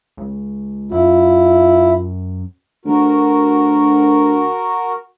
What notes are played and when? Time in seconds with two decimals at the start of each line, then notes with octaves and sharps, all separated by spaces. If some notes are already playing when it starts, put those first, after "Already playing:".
0.17 C#2
0.91 F#2 E4 F4
2.85 D2 F#4 A#4